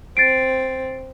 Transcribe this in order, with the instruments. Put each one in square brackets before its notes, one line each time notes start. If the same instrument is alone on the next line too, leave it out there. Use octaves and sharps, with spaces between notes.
[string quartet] C4 [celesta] A6 C7 D7